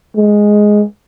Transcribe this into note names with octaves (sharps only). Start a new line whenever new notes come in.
G#3